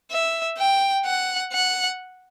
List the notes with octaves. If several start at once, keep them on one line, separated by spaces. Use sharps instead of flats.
E5
G5
F#5
F#5